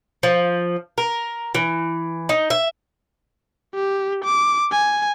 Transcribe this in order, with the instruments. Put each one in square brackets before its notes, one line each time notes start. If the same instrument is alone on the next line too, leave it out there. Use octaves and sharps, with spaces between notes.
[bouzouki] F3
A#4
E3
D#4
E5
[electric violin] G4
D6
G#5